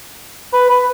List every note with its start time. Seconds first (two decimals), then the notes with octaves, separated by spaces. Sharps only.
0.53 B4
0.70 B4